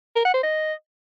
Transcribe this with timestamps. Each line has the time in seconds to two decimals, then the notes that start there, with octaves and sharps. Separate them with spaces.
0.16 A#4
0.25 F#5
0.34 C5
0.43 D#5